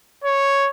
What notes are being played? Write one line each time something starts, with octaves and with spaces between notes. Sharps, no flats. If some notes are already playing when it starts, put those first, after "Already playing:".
C#5